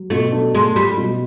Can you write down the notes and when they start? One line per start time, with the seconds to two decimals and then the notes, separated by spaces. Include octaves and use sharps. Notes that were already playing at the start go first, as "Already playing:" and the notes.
Already playing: F#3
0.10 B2 A3
0.32 D4
0.55 G#3 A3
0.76 F#3 G3
0.98 B2